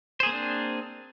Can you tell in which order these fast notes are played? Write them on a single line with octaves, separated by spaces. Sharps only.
C5 G#4 A#3 C4 D4